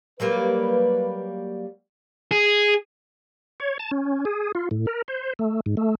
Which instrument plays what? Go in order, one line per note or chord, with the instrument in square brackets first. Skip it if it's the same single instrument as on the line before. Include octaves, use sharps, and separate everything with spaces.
[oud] F#3 G3 A#3 [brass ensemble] B4
[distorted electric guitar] G#4
[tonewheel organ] C#5
A5
C#4
G#4
F4
A2
A#4
C5
A3
G#2
A3